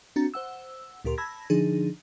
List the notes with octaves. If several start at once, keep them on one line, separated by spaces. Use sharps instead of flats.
C4 D4 F#4 A#5 A6
C5 F#5 E6
D2 A#2 G4 A#4 C6
A5 B5 E6 G#6 A#6
D3 F3 D4 D#4 G#4